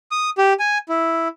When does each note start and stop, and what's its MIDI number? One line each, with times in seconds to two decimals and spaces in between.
0.11 0.30 87
0.38 0.53 67
0.60 0.78 80
0.89 1.28 64